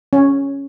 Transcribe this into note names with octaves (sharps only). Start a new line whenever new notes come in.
C#4